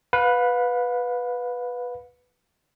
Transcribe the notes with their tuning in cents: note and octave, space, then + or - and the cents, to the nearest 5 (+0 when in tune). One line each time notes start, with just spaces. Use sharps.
B4 +0 F5 +40